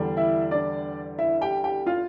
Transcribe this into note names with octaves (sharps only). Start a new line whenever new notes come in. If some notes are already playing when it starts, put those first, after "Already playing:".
Already playing: E2 D3 G3 D4
E4 E5
D4 D5
E4 E5
G4 G5
G4 G5
F4 F5